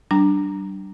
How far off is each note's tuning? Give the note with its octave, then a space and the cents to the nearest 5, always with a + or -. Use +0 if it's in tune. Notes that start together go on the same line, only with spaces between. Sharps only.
G3 -35 D4 +0 A#5 +0